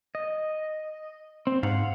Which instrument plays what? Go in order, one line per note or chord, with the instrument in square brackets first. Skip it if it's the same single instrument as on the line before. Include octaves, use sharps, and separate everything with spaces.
[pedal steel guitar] D#5
C4
[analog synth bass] G#2 [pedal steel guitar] F5 F#5